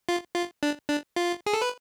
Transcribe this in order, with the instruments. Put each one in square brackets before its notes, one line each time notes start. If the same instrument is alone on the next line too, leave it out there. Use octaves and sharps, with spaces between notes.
[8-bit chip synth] F4
F4
D4
D4
F4
G#4
A4
B4